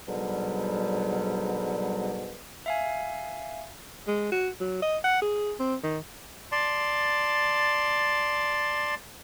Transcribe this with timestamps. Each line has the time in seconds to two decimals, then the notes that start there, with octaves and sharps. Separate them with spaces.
0.07 G#2 B2 D3 F#3 G3
2.66 E5 F5 G#5
4.07 G#3
4.31 F#4
4.60 F#3
4.82 D#5
5.04 F#5
5.22 G#4
5.59 C4
5.83 D#3
6.52 D5 A5 C6